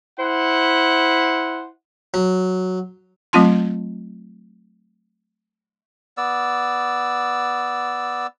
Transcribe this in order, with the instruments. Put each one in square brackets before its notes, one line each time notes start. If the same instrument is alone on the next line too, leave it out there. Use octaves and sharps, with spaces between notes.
[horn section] E4 C5 F#5
[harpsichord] F#3
[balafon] F#3 A3 C4 F4 A5 C6
[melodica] B3 D5 E6